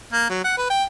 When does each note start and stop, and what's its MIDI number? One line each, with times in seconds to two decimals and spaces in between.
0.13 0.27 58
0.30 0.40 54
0.44 0.57 78
0.58 0.66 71
0.70 0.84 79